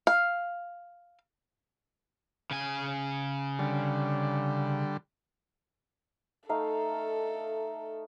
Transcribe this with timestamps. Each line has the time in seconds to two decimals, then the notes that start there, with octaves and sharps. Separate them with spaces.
0.07 F5
2.51 C#3 G#5
3.59 D3 G3
6.49 A3 D#4 A4 F5